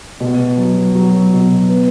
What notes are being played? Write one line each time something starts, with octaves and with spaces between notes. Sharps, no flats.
B2
F#3
F#3
B2
B3